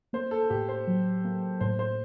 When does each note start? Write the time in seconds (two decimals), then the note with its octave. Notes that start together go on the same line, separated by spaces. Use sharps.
0.13 A#3 C5
0.31 A4
0.50 A2 G4
0.69 C5
0.87 F#3
1.25 A#3
1.61 A2 C5
1.79 C5